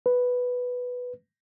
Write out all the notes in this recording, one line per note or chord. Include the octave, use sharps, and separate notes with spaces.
B4